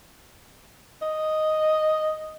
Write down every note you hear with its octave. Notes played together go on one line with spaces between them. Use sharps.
D#5